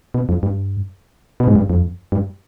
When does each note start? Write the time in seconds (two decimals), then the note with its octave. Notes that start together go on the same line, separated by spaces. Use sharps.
0.14 B2
0.29 F2
0.43 G2
1.40 B2
1.47 G#2
1.55 G2
1.70 F2
2.12 G2